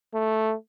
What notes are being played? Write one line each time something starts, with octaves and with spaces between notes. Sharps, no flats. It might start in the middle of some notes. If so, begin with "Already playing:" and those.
A3